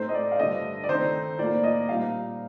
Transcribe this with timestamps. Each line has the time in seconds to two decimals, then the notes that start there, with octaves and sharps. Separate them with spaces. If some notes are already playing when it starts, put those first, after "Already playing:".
Already playing: A2 A3 C4 D#4 C5
0.09 D#5
0.14 D5
0.31 F5
0.39 G2 D3 A3 D4 D#5
0.84 D5
0.89 D#3 A3 C4 D#4 C5
1.38 A2 F3 A#3 D5
1.64 D#5
1.88 A#2 G3 C4 D#4 F5